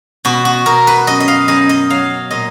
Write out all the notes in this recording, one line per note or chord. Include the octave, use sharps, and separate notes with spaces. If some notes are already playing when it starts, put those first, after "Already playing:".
B2 F#4
F#4
B2 A#4
B4
F#2 D#5
D#5
F5
F#2 D#5
D#5
F#3 F5
A#2 D#5